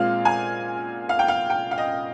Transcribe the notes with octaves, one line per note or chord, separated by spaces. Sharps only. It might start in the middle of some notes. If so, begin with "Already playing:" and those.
Already playing: A#2 G#3 C4 F4 F5
G#5
F5
G5
F5
G5
F5
D#5